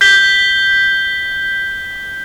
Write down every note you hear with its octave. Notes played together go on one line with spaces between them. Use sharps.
G6 B6 G7